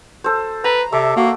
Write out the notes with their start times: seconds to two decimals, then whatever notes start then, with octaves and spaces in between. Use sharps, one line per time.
0.24 A4 C5
0.64 B4 A#5
0.92 C3 A4 D5 E5
1.16 A#3 F#4